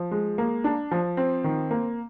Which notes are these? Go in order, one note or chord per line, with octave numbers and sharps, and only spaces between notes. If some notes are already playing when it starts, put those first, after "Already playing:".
Already playing: F3
G#3
A#3
D4
F3
C4
D#3
A#3